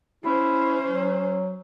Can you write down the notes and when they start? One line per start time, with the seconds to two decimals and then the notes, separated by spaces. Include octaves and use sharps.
0.24 C#4 E4 C5
0.87 F#3